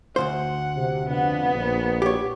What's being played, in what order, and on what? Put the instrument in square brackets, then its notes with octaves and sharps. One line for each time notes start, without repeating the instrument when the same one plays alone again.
[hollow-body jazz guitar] D2 B2 C5 [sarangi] F#5
[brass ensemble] C3
[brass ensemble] F2 D4 F#5 [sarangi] B3
[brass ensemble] A#1
[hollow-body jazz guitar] G4 C#5